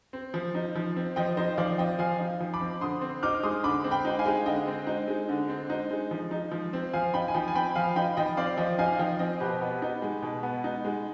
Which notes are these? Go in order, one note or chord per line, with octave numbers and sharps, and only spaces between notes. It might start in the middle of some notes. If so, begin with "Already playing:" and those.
C4
F3
D#4
F3
C4
F3 D#5 G5
D#4 C5 D#5
F3 D5 F5
C4 D#5 G5
F3 F5 G#5
D#4
F3
B5 D6
C4
D3 C6 D#6
C4
D#4 D6 F6
G#3 C6 D#6
D3 B5 D6
C4
G5 B5
D#4
F5 G#5
G#3
D3 D#5 G5
C4
D#4
G#3
D3
C4
D#4
G#3
F3
D#4
F3
C4
F3 F5 G#5
D#4 G5 B5
G#5
F3 G5 B5
G#5
C4 G5 B5
F3 F5 G#5
D#4 G5 B5
F3 D#5 G5
C4 D5 F5
F3 D#5 G5
D#4 F5 G#5
F5
F3 D#5 G5
C4 D#5 G5
B2 G4 B4
B3
D#4
G#3
B2
B3
D#4
G#3